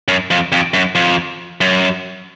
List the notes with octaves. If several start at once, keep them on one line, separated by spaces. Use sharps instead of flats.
F#2
F2
F2
F#2
F2
F#2